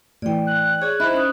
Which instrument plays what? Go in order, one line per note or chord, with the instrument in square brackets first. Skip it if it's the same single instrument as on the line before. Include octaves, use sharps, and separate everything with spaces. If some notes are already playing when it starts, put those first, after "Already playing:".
[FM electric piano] A2 E3 [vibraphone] D5 G5
[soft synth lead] F#6
[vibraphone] G#4 [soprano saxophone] C#5 [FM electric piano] D5
[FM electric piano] D#4 [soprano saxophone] E4 [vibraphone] C5 D#5
[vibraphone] C#4 D#6